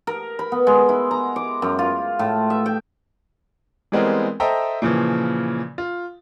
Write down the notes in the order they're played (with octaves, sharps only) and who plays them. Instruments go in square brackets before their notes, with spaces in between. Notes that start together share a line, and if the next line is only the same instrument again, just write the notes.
[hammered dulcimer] A#4
B5
B3
G#3
E4
A#5
D6
F#2
F4
A2
E5
G5
[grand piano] E3 G3 G#3 B3 C4 A#4
A4 C5 D#5 E5 G5 A#5
A#2 C#3 E3 F3
F4